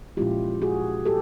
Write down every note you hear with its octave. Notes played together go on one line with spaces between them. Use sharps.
A#2 F3 G#3 C#4 E4 F4 G4
F#4 G#4
G4 A4